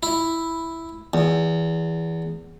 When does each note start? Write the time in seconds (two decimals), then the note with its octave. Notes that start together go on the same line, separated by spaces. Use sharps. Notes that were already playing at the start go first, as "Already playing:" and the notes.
0.03 E4
1.14 E2